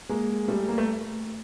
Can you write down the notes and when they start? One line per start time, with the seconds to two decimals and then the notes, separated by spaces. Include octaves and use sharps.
0.09 G#3 A#3
0.48 G3 A3
0.68 A#3
0.78 A3